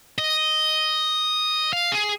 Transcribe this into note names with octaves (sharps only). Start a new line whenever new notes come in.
D#5
F5
G#4